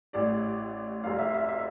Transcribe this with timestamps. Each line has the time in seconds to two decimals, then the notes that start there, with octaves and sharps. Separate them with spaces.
0.13 A1 A2 G3 D5
1.04 F1 F2 C3 G3 F5
1.19 E5
1.34 E5
1.49 E5